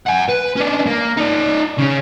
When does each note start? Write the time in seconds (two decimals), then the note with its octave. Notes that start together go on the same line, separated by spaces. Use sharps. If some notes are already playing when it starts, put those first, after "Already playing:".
0.07 F#5 G#5
0.29 B4
0.57 C#4 D4
0.87 A#3
1.17 D#4 D5
1.78 C#3 C#4